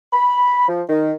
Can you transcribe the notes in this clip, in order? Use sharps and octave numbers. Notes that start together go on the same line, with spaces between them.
B5
F3
D#3